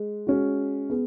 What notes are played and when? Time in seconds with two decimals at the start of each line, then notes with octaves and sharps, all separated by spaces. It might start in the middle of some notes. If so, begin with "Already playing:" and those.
Already playing: G#3
0.27 G#3 C#4 F#4
0.90 B3 G#4